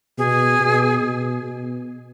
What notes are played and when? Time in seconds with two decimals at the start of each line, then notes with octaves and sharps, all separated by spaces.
0.18 B2 G#4
0.59 B2
1.01 B2
1.42 B2